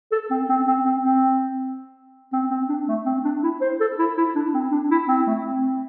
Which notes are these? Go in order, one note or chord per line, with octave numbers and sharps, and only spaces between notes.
A4
C4
C4
C4
C4
C4
C4
C4
D4
A3
C4
D4
E4
C5
A4
E4
E4
D4
C4
D4
E4
C4
A3
C4